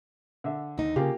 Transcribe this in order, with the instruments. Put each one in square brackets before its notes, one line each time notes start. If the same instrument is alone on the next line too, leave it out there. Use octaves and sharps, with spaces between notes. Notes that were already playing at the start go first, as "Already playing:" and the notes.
[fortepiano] D3 E5
[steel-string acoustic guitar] D#2 D#4
[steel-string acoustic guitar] C#3 [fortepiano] A#3 F4 G4